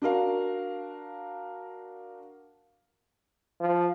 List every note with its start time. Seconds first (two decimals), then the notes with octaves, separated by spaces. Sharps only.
0.02 D4 F#4 A#4 F5
3.61 F3